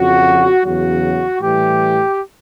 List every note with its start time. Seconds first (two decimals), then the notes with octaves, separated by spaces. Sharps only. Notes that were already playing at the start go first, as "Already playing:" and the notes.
Already playing: F2 C#3 F3 F#4
0.65 E2 C#3 F#3 F#4
1.41 A2 E3 G3 G4